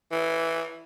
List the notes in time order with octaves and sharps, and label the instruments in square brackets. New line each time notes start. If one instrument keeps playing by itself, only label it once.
[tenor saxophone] E3